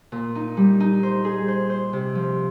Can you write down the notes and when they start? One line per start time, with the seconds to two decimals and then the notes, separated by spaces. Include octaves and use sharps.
0.12 A#2
0.35 D#4
0.57 G3
0.80 D#4
1.03 C5
1.25 G#4
1.48 C5
1.70 C5
1.93 C3
2.15 F3